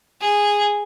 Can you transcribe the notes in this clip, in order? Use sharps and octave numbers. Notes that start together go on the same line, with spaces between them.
G#4